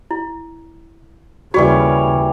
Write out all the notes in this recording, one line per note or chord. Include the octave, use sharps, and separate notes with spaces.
E4
D#2 C#3 E3 G3 F#4 C#5